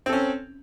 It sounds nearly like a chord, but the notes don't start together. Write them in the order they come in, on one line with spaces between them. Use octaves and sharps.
C4 A4 C#4